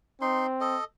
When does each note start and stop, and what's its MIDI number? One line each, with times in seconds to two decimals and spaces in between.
0.21 0.77 60
0.21 0.46 63
0.21 0.46 84
0.61 0.84 69
0.61 0.84 75